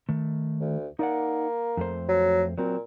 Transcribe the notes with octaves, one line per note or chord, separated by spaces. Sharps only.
D#3 A3
D2
A#3 D#4 D5 F#5
F2 A3 C5
F#3
A#2 F#3 C4